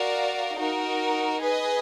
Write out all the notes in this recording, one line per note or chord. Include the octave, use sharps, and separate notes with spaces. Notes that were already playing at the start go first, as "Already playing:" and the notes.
Already playing: F#4 A#4 D5 F5
D#4 F#4 A#4
G#4 B4 D#5